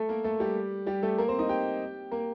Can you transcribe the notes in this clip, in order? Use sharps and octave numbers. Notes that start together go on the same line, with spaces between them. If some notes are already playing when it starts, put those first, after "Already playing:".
Already playing: A3 A4
A#3 A#4
A3 A4
G3 G4
G3 G4
A3 A4
A#3 A#4
C4 C5
D#4 D#5
G4 G5
A#3 A#4